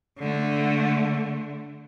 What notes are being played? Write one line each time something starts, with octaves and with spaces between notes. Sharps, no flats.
D3 A3